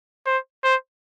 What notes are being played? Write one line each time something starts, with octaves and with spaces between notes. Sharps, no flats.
C5
C5